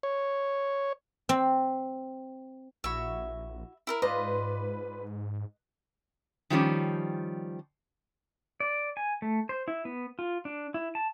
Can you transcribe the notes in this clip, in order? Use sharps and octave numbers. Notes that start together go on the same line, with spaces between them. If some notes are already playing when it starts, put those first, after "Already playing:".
C#5
C4
A#1 E4 F#4 E5 B5
E4 A4 A#4
G#2 F4 B4 C5 D5 D#5
D#3 F3 G3 C#4
D5
G#5
A3
C5
E4
B3
F4
D4
E4
A5